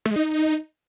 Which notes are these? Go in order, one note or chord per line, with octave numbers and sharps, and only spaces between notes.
A3
G#3
D#4